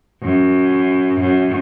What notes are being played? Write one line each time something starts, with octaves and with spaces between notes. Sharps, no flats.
F#2
F#2